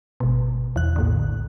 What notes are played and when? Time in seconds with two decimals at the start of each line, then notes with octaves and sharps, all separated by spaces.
0.20 G#1 B2
0.76 E2 F#6
0.96 A#1 A2 D3